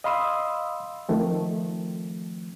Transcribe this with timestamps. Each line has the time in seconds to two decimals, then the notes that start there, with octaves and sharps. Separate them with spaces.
0.04 D#5 F5 B5 C6 D#6 E6
1.09 D#3 F3 A3 C4